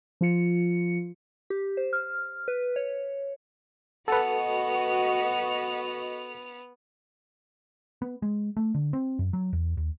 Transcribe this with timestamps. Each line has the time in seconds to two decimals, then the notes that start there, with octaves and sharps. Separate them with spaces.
0.21 F3 F4 C#7
1.50 G4
1.77 C5
1.93 F6
2.48 B4
2.76 C#5
4.08 B3 F#4 A4 B4 D#5 F#5 F7
8.02 B3
8.22 G#3
8.57 A3
8.75 D3
8.93 C4
9.19 F#2
9.33 F#3
9.53 E2
9.77 D#2